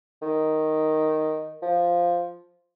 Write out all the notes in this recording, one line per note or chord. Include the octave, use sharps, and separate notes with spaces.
D#3
F3